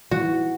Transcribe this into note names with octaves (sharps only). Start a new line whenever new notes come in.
E3 F#4